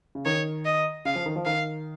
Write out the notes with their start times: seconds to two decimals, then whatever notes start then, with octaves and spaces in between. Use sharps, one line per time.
0.15 C#3
0.25 D#3 C#5
0.65 D#5
1.05 C#3 F5
1.15 F3
1.26 D#3
1.36 F3
1.45 D#3 F5